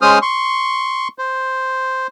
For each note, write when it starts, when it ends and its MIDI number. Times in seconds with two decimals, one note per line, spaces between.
0.02 0.19 56
0.02 0.19 61
0.02 0.19 72
0.02 0.19 87
0.02 0.19 89
0.22 1.08 84
0.22 1.08 85
1.18 2.07 72